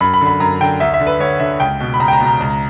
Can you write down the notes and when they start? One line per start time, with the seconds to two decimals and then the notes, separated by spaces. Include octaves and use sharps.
0.01 F#2 B5
0.14 B5
0.21 D3
0.27 B5
0.40 F#2 A#5
0.60 D3 G5
0.80 D2 E5
0.94 E5
1.00 D3
1.07 B4
1.20 D2 C#5
1.40 D3 E5
1.60 C#2 G5
1.80 B2
1.94 B5
1.99 C#2 A#5
2.08 G5
2.13 A#5
2.20 B2
2.26 A#5
2.40 C#2